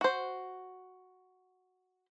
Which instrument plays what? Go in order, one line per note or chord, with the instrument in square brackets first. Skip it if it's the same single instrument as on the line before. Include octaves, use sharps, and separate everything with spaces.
[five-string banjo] F#4 C5